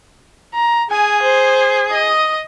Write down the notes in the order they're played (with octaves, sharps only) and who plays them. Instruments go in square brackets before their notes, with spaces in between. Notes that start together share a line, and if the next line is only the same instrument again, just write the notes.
[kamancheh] A#5
[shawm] G#4 [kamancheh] G#5
[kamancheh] C5
D#5 D#6